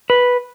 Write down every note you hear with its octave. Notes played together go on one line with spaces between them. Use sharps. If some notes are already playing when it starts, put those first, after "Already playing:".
B4